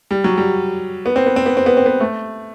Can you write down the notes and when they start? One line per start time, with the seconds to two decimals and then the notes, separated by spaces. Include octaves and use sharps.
0.11 G3
0.24 F#3
0.38 G3
1.06 B3
1.16 C4
1.26 B3
1.36 C4
1.46 B3
1.57 C4
1.66 B3
1.77 C4
1.86 B3
2.00 A3